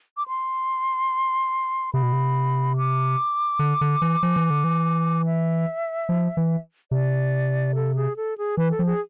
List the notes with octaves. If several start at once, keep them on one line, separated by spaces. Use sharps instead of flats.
D6
C6
C3 B5
B2
C3
D6
D3
D3
E3
F3
E3
D3
E3
E5
F3
E3
C3 D5
A4
G#4
A4
G#4
E3 B4
A4
F3
G#4